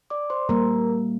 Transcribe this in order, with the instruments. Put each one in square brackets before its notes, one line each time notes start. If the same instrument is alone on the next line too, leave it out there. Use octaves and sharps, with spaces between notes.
[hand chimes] D5 D6
C5 C6
[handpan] G3 A#3 [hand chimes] A#4 A#5